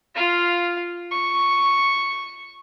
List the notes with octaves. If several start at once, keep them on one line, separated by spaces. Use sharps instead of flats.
F4 F5
C#6